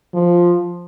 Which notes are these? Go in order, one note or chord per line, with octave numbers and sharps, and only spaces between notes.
F3